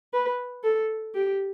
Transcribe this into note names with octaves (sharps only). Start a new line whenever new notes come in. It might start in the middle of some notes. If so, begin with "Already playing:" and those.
B4
A4
G4